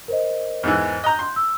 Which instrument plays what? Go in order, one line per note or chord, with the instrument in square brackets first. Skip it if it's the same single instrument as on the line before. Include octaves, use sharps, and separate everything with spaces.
[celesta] A#4 C5 D#5
[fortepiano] E2 G#2 E3
[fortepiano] D#5 A#5 [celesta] F#6 G6
[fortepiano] C6
[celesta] E6